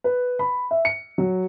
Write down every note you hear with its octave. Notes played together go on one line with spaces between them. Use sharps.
B4
B5
E5
C#7
F#3